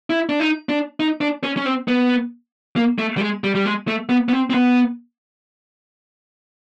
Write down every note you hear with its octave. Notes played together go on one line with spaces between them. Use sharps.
E4
D4
D#4
D4
D#4
D4
C#4
C#4
C4
B3
A#3
A3
G3
G#3
G3
G3
G#3
A3
B3
B3
C4
C4
B3